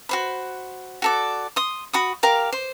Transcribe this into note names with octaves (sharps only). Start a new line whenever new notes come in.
F#4 C5 B5
F#4 A4 D5
C6 D#6
F#4 B5 D#6
G4 A#4 F5
C5